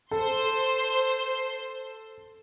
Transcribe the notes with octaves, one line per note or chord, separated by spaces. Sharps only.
A4 C5 C6